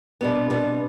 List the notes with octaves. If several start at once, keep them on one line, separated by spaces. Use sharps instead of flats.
B2 G3 B3 D4
D4
C4
B2 G3 B3